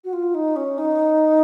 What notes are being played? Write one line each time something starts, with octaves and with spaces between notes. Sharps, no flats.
F#4
F4
D#4
C#4
D#4